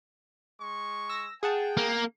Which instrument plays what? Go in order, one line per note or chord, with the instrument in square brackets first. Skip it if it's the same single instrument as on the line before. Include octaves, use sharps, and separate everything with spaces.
[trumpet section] G#3 C#6
[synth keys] E6 A#6
[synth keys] G#4 F#5 A5 [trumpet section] G5
[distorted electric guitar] A#3